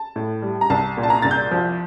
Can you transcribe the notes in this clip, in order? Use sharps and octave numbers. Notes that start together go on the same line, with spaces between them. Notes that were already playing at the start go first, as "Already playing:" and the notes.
Already playing: A5
A2
G3
A#5
C2 A5
A#2
A5
A#5
C2 A6
G6
F3